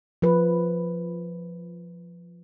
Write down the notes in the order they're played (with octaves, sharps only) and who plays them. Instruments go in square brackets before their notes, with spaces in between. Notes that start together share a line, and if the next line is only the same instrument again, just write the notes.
[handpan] F3 B4